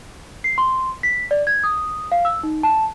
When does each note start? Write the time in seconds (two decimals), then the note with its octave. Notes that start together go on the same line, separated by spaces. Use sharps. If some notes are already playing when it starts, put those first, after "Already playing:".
0.44 C7
0.58 C6
1.03 B6
1.31 D5
1.47 G#6
1.64 D#6
2.12 F5
2.25 E6
2.43 D#4
2.63 A5